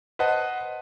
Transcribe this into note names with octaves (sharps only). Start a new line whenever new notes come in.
B4 C5 D#5 F#5 A5